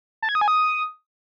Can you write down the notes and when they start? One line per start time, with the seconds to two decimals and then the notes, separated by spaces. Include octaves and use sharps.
0.22 A5
0.29 G#6
0.35 D#6
0.41 G#5
0.48 D#6